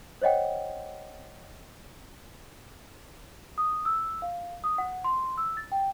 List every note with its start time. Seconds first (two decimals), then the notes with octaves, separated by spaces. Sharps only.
0.22 C5 C#5 D#5 F#5 G5
3.58 D#6
3.85 E6
4.22 F5
4.64 D#6
4.78 F#5
5.04 C6
5.37 E6
5.57 A6
5.72 G5